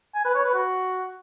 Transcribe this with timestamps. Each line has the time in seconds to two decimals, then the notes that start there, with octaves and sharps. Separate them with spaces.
0.15 G#5
0.25 B4
0.35 C#5
0.45 B4
0.54 F#4